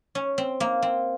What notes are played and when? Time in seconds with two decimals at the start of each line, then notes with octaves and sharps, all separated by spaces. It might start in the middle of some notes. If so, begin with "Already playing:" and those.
0.15 C#4
0.38 C4
0.60 A#3
0.82 C4